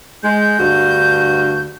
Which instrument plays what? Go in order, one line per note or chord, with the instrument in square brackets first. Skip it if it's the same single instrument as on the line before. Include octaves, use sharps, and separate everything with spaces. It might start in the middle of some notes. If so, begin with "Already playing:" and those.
[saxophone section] G#3 [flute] G6
[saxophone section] D2 G2 F#4